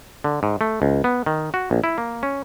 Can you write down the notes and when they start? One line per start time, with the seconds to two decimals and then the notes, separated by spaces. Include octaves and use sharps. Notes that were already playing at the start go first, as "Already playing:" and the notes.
0.24 D3
0.43 G#2
0.61 A3
0.82 C#2
1.04 B3
1.26 D#3
1.54 F#4
1.71 A#1
1.84 E4
1.98 A#3
2.23 C#4